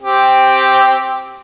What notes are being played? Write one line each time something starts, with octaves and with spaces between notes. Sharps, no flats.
C4 G4